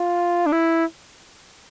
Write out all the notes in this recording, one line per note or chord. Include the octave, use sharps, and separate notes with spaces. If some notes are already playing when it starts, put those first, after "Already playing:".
Already playing: F4
D4
E4